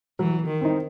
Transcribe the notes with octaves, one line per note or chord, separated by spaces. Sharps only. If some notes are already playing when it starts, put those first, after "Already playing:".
E3 F#3
D#3
C4 D#4